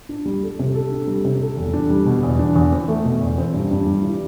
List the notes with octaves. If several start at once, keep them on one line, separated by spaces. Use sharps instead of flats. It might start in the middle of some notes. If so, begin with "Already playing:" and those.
D4
G3
A4
C3
A4
D4
G3
C3
A4
E2
D4
G3
B2
E2
D4
E2
C4
A3
B2
E2
C4
G2
G2
G3
E3